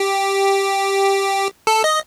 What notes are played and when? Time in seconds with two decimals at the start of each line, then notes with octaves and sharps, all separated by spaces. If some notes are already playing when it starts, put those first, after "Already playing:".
Already playing: G4
1.67 A4
1.84 D#5